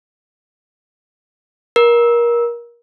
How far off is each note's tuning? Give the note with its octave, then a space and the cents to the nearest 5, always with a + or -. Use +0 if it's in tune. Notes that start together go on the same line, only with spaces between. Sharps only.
A#4 +25